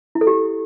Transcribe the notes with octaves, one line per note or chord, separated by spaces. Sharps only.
E4
A4
G4